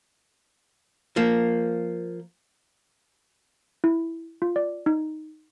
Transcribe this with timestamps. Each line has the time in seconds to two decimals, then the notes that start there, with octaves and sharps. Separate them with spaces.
1.16 F3 A#3
3.84 E4
4.42 F4
4.56 D5
4.86 D#4